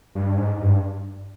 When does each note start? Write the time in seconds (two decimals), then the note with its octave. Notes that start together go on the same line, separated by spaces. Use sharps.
0.15 G2
0.37 G#2
0.61 G2